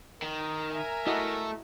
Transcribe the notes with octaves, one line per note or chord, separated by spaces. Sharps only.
D#3 A#4
E5 G#5 A#5
A3 E4 F#4 D#5